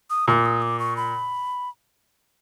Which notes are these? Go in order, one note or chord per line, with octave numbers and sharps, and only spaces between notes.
D#6
A#2 D6
D#6
D6
C#6
B5